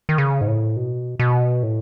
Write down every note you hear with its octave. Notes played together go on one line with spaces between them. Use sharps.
D#3
C#3
G#2
A2
B2
B2
A2